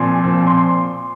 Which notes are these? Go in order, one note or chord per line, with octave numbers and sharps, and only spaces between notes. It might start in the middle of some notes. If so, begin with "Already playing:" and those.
Already playing: A#2 F3 C4 G#5 C6
A#2 F3 C4
C6